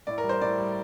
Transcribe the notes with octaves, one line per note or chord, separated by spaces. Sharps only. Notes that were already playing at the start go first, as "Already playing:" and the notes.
A2 D5
A#4
G3
C5
A2 D5
G3